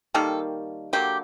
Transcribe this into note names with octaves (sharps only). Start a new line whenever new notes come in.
D#3 G3 A#3 A4
D3 F#3 A#3 G4